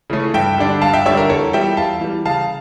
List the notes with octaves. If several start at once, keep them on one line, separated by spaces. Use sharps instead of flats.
C#3 E3 A3 C#4
G2 E5 G5
D3 G3 D4
G2 F5 A5
E5 G5
D3 G3 D4 C#5 E5
A#4
E2 A4 C#5
E3 G3 E5 G5
E2 F5 A5
E3 G3
C#3 F5 A5